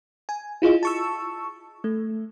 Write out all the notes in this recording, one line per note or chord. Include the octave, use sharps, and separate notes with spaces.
G#5
E4 F4 G#4 D#5
A5 C#6 E6
A3